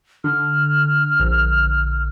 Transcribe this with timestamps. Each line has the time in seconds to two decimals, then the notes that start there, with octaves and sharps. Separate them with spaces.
0.24 D3 F6
1.20 A#1